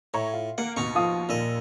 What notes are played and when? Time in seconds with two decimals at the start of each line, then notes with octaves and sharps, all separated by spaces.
0.14 A2 C#5 A#5 C#6
0.33 F4
0.58 A#3 F#5
0.76 D#2 B2 D#4 C#6
0.95 F3 F4 D#6
1.29 D#2 A#2 D#5 E6